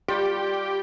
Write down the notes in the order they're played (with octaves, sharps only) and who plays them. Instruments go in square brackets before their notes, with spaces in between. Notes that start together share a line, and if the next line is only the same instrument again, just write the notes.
[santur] G3 F4 [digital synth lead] G4